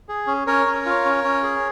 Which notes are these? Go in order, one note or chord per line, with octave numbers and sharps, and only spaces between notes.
G#4
C#4
C#4 A#4 C#5
C#4
F4
C#4
C#4
G#4